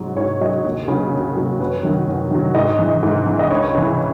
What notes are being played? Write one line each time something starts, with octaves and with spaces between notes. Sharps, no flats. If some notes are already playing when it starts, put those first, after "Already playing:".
Already playing: G#2 F#3
G#2 C#5
F#3 D#5
D#2
C#3 F#3
D#2
C#3 F#3
F#2 B4
D#3 F#3
F#2
D#3 F#3
G#2 D#5
E3
G#2
E3
D#5
C#2 C#5
C#3 E3